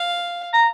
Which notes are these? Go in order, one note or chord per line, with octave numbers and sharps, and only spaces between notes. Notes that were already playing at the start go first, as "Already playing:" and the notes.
Already playing: F5
A#5